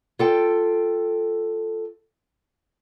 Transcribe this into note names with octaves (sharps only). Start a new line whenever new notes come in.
F4 A4 G5